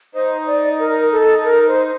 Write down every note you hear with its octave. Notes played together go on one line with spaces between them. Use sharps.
D#4 C5
D5
A#4
A4
A#4
C5